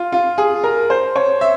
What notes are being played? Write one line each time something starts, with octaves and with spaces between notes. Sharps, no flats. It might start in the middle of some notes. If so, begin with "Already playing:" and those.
Already playing: F4
F4
G#4
A#4
C5
C#5
E5